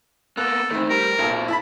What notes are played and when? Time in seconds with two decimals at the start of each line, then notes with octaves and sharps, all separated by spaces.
0.37 A#3 B3 A4 F#6
0.71 D#3 E3 A3 C4
0.90 G3 A#4
1.19 B1 F#2 A#2 A4
1.48 E4 A5 B5